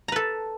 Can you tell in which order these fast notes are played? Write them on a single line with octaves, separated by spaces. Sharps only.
A#5 B4 A4